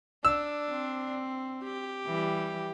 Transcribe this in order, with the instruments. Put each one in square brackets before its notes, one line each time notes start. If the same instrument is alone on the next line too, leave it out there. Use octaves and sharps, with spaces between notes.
[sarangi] D4 [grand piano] E6
[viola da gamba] C4
[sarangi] G4
[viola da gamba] E3 G3